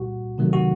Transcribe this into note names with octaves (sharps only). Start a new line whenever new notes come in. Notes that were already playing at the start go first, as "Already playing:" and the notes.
Already playing: A#2 G3 F#4
C3 D#3 F#3 A3
F#4